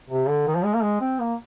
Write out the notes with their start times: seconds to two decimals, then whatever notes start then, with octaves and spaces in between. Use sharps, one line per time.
0.10 C3
0.29 D3
0.47 D#3
0.55 F3
0.64 G#3
0.74 A#3
0.83 G#3
1.01 C4
1.20 A#3